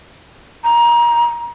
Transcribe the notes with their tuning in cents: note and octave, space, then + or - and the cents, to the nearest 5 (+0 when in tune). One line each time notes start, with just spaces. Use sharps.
A#5 +20